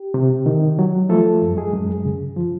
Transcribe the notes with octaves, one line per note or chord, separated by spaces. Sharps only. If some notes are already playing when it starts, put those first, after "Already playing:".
Already playing: G4
C3
D#3
F#3
F3 A3 A4
F#2
G#3 G#4
F#2
C#3
F3